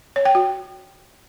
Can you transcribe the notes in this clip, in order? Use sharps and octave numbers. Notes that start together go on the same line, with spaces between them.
C#5
G5
F#4